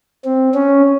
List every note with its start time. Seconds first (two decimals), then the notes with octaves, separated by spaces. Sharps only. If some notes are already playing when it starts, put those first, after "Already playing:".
0.25 C4
0.54 C#4